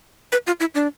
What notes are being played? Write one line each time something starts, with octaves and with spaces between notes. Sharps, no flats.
B4
F4
E4
D4